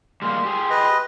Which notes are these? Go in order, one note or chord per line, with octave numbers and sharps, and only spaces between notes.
G3 G#3 A#3 C6
G4 G#4
B4 D#5